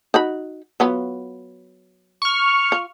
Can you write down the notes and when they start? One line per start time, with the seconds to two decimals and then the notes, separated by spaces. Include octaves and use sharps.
0.14 D#4 F#4 B5
0.80 F#3 B3 F4
2.22 C#6 F6
2.72 F4